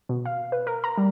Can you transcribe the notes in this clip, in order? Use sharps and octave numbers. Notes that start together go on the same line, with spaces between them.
B2
F5
B4
A#4
A#5
G3